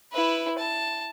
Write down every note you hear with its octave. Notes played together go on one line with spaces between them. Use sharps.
E4 B4
A5